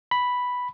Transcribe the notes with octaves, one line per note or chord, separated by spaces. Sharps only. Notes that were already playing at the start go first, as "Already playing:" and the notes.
B5